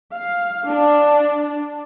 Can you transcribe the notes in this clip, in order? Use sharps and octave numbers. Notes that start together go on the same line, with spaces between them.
F5
D4